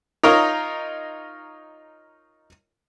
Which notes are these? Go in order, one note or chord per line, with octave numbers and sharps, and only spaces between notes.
D#4 F4 A#4 C#5 D#5